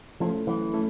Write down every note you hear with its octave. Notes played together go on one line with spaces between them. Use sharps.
F3 A3 C#4 E4 A4
E3 F#3
A3 C#4 E4 A4